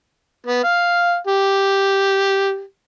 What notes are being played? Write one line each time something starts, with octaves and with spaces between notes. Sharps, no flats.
B3
F5
G4